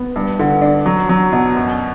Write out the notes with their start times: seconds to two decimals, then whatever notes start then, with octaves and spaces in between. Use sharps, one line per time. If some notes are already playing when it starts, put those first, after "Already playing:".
Already playing: B3
0.16 G2
0.39 D3
0.62 D4
0.86 F#3
1.09 F#3
1.33 B2
1.56 F#2